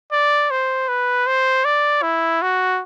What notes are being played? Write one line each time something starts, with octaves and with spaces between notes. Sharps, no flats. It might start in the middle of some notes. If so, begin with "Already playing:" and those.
D5
C5
B4
C5
D5
E4
F#4